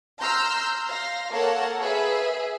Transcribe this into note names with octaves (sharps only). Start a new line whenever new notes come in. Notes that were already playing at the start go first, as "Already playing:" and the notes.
A#5 C6 E6 F6 G6
F5 C6 A#6
A#3 A4 A#4 C#5 F#5 A5
G#4 B4 E5